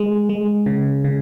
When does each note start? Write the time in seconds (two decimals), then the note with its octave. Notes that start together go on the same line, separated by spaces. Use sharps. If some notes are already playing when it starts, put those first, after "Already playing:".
Already playing: G#3
0.29 G#3
0.66 C#3
1.04 C#3